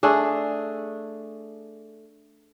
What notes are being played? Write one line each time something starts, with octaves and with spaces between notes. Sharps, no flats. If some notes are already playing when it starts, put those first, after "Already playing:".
A3 D4 G#4